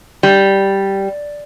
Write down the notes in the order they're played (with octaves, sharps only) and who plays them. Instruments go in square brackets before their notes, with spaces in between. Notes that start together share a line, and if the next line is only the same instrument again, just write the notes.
[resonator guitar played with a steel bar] G3